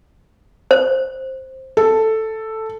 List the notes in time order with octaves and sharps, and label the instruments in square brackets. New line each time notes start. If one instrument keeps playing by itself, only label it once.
[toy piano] C5
[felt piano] A4